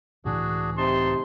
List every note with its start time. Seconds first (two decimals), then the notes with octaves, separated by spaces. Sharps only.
0.25 C#2 A2 E3 D4 F#4 G#4
0.78 C3 D#4 A5 C6